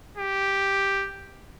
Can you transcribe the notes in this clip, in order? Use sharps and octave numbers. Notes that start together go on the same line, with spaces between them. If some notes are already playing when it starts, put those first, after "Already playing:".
G4